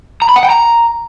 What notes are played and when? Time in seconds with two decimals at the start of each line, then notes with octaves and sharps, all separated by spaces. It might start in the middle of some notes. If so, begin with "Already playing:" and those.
0.22 A#5
0.29 B5
0.36 F#5
0.43 G5
0.50 A#5